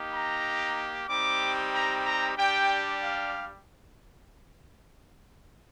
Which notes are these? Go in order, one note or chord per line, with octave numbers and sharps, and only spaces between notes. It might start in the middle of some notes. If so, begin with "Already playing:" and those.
Already playing: A#3 D#4 G4
A#5
G3 C4 D#4 G4 D6
A#5
A#5
G3 D4 G4 G5
F5